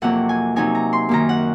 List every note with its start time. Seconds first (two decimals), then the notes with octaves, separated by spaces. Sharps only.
0.02 F2 C3 F#3 A#3 F#5
0.29 G#5
0.56 C3 F#3 C4 D#4 G#5
0.75 A#5
0.93 C6
1.09 F#2 D#3 A#3 D#4 A#5
1.29 F#5